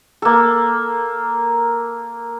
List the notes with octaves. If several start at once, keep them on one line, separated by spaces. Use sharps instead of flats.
A#3 A4